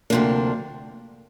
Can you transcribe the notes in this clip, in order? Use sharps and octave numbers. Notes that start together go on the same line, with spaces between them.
D2 C3 F3 A#3 D4